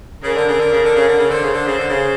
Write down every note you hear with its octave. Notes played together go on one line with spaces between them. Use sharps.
C#3 A#4
D3
C#3
D3
C#3
D3
C#3
D3
C#3
D3 C5
C#3
D3
C#3
D3
C#3